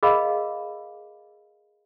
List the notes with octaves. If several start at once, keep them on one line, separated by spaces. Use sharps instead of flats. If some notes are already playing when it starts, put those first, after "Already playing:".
G#4 A#4 D#5 F5 B5